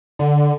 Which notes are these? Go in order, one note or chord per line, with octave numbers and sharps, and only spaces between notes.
D3